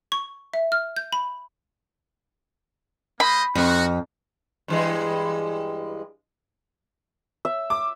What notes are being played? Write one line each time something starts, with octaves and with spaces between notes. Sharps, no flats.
C#6
E5
F6
G6
B5
A#3 C5 D#5 B5
F2 D#4 F#4
G2 E3 G#3
E5
D6